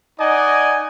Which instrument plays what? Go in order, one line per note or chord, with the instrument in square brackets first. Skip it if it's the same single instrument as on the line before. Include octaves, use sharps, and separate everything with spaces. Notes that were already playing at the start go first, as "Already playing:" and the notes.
[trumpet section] D#4 D5 D#5 F#5 G#5